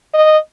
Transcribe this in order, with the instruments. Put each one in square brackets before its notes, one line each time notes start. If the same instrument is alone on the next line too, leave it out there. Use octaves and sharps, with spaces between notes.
[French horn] D#5